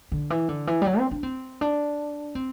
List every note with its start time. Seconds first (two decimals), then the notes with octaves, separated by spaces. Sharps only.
0.12 D3
0.30 E3
0.49 D3
0.67 E3
0.82 G3
0.86 F#3
0.99 C4
1.11 D4
1.23 C4
1.61 D4
2.35 C4